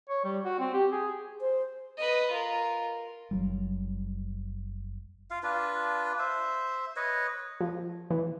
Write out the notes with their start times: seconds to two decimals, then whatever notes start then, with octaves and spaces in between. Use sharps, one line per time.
0.09 C#5
0.25 G3
0.45 F#4
0.60 C4
0.74 G4
0.92 G#4
1.41 C5
1.98 B4 D#5
2.31 F4 A#4
3.31 F#1 F#3 G3
5.31 F4 F5
5.43 D4 F4 B4
6.19 C5 E5
6.96 B4 C#5 D#5
7.61 F3
8.10 E3